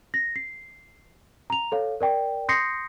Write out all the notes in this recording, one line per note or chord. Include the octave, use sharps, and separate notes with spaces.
A#6
C7
A#5 F7
A4 C#5 F5
A#4 D5 G5
C6 D#6 G6 A#6 C7 C#7